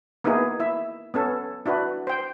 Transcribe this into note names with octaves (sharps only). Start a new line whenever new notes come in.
A#3 B3 D#4 E4 G#4
E4 E5
B3 C#4 A4
D4 E4 F#4 B4
C5 G5